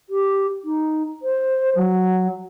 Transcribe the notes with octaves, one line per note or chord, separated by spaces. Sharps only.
G4
D#4
C5
F#3